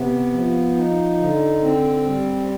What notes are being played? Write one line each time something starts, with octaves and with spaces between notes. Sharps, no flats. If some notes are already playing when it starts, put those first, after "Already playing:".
Already playing: C3 B3
F3
D#4
D3
C4
G3